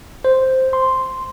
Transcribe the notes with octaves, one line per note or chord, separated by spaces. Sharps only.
C5
C6